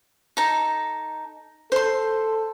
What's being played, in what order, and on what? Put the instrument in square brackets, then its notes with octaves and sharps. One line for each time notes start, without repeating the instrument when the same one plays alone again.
[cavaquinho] D#4 A4
[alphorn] A4 [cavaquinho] C5 C6